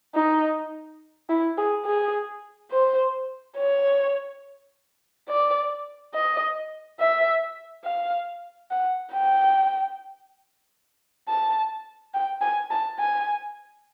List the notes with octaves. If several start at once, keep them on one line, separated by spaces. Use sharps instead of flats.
D#4
E4
G#4
G#4
C5
C#5
D5
D#5
E5
F5
F#5
G5
A5
G5
G#5
A5
G#5